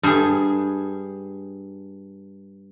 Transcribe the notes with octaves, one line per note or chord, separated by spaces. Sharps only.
G2 G#4